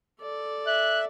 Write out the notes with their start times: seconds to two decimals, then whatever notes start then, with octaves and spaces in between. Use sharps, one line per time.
0.20 A4 D5
0.67 E5 F#6